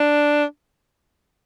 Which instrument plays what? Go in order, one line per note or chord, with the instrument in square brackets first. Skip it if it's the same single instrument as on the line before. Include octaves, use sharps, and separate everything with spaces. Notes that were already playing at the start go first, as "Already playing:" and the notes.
Already playing: [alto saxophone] D4